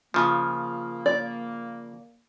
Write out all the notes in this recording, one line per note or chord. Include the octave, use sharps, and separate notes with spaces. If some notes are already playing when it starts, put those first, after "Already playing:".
C#3 F3 A#3
D5